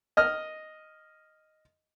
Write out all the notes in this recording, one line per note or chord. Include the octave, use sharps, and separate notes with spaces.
D#5 F6